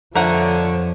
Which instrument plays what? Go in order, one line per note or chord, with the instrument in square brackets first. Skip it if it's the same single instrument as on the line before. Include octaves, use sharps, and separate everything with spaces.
[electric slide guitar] F2 C5 E5 [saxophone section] D3 C#5 [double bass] F3 [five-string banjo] A#4 F#5